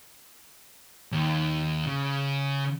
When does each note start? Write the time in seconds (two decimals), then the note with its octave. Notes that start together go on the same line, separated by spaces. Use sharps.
1.12 D#2
1.86 C#3